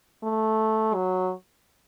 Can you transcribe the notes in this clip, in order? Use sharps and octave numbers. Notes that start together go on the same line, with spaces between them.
A3
F#3